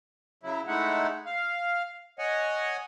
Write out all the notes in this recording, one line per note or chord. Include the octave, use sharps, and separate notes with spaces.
C#3 F#3 E4
G#3 A3 D#4 E4 F#5
F5
C#5 D#5 F#5 G#5